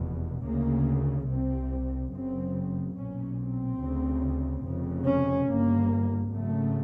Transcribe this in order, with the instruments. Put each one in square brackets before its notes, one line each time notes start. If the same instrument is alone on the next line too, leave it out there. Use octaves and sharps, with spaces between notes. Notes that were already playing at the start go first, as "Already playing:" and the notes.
Already playing: [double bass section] F1 E2 B2
D2 C#3 A#3
C2 C3 C4
F#1 F#2 C#3 C4
B1 A#2 C#4
C4
D2 C#3
F1 F2 C#3
C#4
G1 G2 A#3
G#1 F#2 C#3 A3